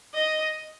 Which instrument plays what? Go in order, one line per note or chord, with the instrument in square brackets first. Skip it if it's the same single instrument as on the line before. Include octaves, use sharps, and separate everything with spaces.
[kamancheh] D#5